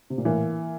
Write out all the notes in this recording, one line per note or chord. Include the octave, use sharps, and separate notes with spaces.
C3
A#2
A2 E3 A#3